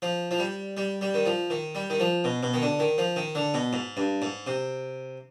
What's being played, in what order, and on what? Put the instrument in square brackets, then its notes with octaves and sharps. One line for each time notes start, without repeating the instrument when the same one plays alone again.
[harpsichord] F3
F3
G3
G3
G3
D#3
F3
D#3
G3
D#3
F3
B2
B2
D#3
D3
D#3
F3
D#3
D3
B2
G#2
G2
G#2
C3